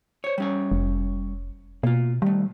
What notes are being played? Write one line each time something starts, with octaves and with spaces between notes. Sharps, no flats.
C5 C#5
G3 C#4 C#5
F1
B2 A#3 F4
D#3 G3 A3